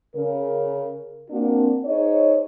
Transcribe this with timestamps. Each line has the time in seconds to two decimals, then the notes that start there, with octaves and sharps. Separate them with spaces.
0.16 C#3 A#4
1.30 A#3 C4 D4 F#4 A#4
1.85 D#4 G#4 C5 C#5